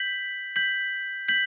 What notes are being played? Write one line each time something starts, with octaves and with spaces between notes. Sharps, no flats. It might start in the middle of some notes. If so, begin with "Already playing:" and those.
Already playing: G6 B6 F#7
G6 B6 F#7
G6 B6 F#7